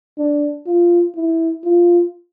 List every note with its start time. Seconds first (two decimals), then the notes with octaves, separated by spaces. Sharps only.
0.18 D4
0.66 F4
1.15 E4
1.64 F4